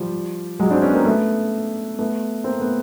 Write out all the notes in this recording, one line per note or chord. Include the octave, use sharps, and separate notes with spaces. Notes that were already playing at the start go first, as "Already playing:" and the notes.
Already playing: F3 G3
F#3 G#3
C4 D4
B3 C#4
A#3 C4
A3 B3
A3 B3
A#3 C4
A3 B3